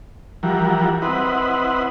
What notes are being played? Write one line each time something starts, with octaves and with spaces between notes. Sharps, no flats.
E3 F3 G3 F#4 A#4
C4 E4 B4 D#5 F#5